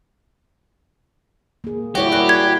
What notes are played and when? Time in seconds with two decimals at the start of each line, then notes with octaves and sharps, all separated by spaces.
1.64 A#3 G#4
1.95 G3 E4 F#4 G4 C#5 D5
2.12 F#4 G#4 A#4 D5 F#5
2.29 G#6